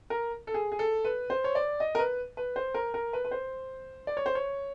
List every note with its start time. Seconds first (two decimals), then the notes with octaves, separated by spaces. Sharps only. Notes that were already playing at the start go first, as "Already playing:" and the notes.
0.10 A#4
0.47 A4
0.54 G#4
0.72 G#4
0.79 A4
1.05 B4
1.30 C5
1.44 C#5
1.55 D5
1.80 D#5
1.95 A#4
1.99 B4
2.37 B4
2.56 C5
2.74 A#4
2.94 A#4
3.13 B4
3.25 B4
3.31 C5
4.07 D5
4.17 C#5
4.26 C5
4.35 C#5